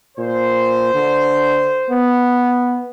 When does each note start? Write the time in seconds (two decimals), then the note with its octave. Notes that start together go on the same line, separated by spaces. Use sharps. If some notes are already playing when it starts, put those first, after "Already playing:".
0.18 A#2 C5
0.94 D3
1.90 B3